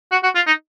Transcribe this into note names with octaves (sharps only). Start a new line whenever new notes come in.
F#4
F#4
F4
D#4